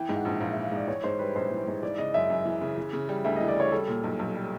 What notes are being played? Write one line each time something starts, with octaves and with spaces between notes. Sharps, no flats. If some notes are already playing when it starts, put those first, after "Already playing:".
Already playing: E3 G5
G#2
F#5
A#1
A#1 F5
E3 E5
F5
G#2 D5
E3 C#5
G#2 C5
G3 B4
A#1 C5
E3
G#2
E3 D5
C#3 D#5
F#2 E5
F#2
E3
C#3
E3
C#3
G3
D2 E5
E3 D#5
D5
C#3 C#5
G3 A4
A#2
B1
B1
G3